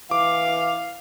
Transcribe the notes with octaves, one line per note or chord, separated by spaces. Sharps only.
E3 F5 D6